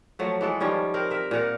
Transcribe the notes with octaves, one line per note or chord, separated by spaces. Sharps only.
F3 F#3 A3
E3 G#3 A4
D#3 F3 G3 C#4
C4 A#4
A#4 E5
A#2 F4 A#4 F#5